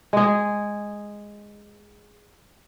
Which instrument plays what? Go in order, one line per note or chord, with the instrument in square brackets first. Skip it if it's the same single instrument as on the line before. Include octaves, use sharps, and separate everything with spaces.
[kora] G#3 G#4